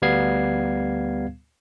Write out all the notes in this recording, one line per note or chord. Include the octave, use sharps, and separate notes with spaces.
D2 G3 B3 F5 G#6 C7